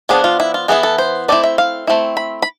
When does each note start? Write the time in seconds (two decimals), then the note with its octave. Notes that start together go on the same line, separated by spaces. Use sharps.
0.09 F3 B3 D4 G#4
0.24 F4
0.40 E4
0.54 F4
0.68 E3 B3 E4 G#4
0.83 A4
0.98 C5
1.28 A3 C4 E4 D5
1.44 E5
1.58 F5
1.87 A3 C4 E4
2.17 B5
2.42 B5